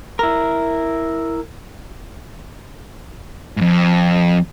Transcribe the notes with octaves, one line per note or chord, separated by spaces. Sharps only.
E4 A#4
F2 G#2